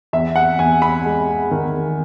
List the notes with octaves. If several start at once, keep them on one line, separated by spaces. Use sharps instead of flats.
E2 E5
F#5
E2 G#5
B5
G#3
D#3